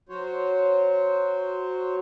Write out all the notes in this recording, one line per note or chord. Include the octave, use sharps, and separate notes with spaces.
F#3 F#4 C5 C#5